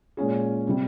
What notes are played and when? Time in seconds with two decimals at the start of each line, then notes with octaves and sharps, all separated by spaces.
0.17 A#2 G#3 C#4 F4 G#4
0.67 C3 G3